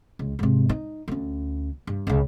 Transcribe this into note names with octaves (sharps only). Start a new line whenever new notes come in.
C#2
G#2 C3
D#4
D2 C#4
G2
C#2 C#3